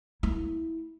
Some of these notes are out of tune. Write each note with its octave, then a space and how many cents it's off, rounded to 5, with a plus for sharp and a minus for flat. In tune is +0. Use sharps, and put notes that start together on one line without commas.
A#3 +0 E4 -20